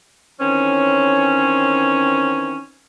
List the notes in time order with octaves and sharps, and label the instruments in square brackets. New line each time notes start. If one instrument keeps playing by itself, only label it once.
[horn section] D#3 E3 C4 C#4